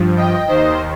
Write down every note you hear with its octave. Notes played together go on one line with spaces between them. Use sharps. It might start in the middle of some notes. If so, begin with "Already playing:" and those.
Already playing: G2 F3
D#5 G5
D#2 D#3 C5 D#5